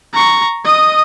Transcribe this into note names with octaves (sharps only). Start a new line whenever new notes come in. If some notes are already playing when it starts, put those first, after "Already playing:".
A#5 C#6
D#5 D#6